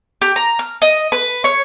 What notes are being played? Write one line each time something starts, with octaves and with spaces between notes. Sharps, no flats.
G4
A#5
F6
D#5
B4
C#5